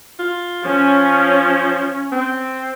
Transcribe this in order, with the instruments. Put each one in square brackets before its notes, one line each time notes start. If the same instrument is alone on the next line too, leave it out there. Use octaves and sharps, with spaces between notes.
[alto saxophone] F4
[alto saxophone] F3 [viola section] C#4
[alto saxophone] C4